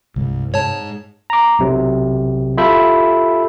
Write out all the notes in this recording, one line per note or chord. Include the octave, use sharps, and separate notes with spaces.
C2 G2 C3 G#3
G#2 C#5 A5
A#5 D6
B1 C3 F#3
F4 G4 A4 E5 B5 G6